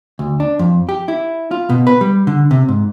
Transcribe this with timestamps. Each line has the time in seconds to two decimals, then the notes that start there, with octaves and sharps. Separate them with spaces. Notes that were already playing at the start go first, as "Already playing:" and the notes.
0.19 D2
0.40 D4
0.59 F2
0.89 G4
1.08 E4
1.51 F4
1.70 B2
1.87 B4
2.01 G3
2.27 D3
2.51 C3
2.68 G#2